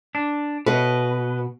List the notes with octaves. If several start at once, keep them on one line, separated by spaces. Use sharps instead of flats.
D4
B2 B4 D#5